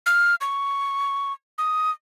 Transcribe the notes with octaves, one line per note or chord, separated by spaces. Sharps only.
F6
C#6
D#6